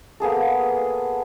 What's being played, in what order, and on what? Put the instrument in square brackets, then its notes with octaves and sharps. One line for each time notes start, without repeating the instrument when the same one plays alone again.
[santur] A#3 B3 G#4 A4